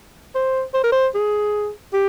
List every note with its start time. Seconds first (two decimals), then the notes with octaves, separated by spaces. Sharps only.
0.35 C5
0.74 C5
0.83 A#4
0.92 C5
1.14 G#4
1.93 G4